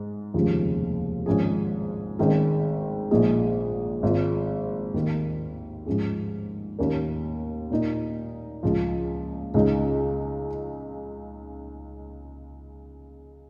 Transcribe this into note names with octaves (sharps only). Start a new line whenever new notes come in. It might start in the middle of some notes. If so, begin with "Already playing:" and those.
Already playing: G#2
F1 D#2 C#3 F3 G#3
G#1 G#2 F3 C#4 G#4
G#1 G#2 D#3 G#3 C#4
A#1 A#2 G#3 D#4 G#4
G#1 G#2 G#3 F4
D#2 D#3 A#3
G#2 F3 C#4 G#4
D#2 D#3 C#4 A#4
A#2 A#3 D#4
C#2 C#3 F3
C#2 C#3 G#3 D#4